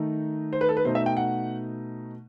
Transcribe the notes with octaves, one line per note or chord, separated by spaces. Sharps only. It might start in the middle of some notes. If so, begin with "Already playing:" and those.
Already playing: D#3 A3 D#4
C5
B4
A4
B4
B2 A3 D#4 C5
E5
G5
F#5